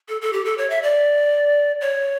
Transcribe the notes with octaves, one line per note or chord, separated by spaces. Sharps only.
A4
A4
G4
A4
C#5
E5
D5
C#5